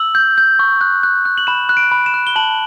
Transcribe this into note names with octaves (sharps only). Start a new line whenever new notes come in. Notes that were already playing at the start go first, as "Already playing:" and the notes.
Already playing: E6 F#7
G6
G6
C#6
F#6
F#6
F#6
F#7
B5 E7
F#6
D7
B5
E7
F#6
G7
A5 F#7